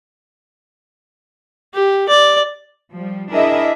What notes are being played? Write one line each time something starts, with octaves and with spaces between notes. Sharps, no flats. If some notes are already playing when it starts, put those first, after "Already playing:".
G4
D5
F3 G3
D4 E4 G#4 A#4 D#5 E5